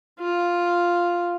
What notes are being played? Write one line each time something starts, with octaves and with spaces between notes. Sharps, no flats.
F4